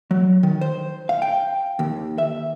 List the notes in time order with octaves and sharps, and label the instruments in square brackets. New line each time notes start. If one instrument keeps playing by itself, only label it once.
[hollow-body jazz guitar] F#3
D#3
C5
F5
G5
D#2
E5